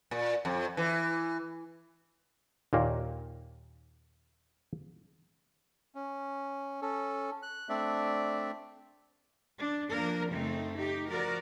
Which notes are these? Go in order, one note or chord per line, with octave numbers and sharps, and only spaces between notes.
A#2
F2
E3
D#2 A#2 A#3
C#4
C#4 A4
F#6
A3 C4 D4 D5 E5
D4
F3 A#3 D4 A#4
F#2 C#3 A3 C4 D#4
D#4 G4
F3 F#4 A#4 D5